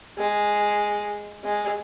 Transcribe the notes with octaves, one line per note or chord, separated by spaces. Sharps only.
G#3
G#3